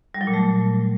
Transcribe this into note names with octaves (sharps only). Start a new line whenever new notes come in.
G3
F#3
A#2
A3